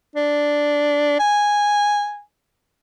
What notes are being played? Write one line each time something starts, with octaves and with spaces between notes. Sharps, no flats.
D4
G#5